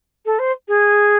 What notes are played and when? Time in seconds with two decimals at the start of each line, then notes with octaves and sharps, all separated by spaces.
0.25 A4
0.39 C5
0.68 G#4